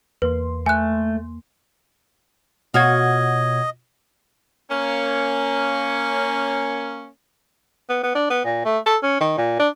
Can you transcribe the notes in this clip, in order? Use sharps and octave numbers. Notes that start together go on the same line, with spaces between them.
E2 A#3 B4 C6
A3 G#5 F#6
B2 F4 F#4 C#5 D#5 G#6
A#3 C#4
B3
B3
D4
B3
A#2
A3
A4
C#4
D#3
A#2
D4